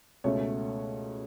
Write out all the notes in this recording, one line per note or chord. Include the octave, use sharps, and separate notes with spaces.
C#2 B2 A3 C#5